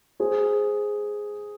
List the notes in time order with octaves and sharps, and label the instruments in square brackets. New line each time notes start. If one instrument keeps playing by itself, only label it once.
[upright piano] G#4 C5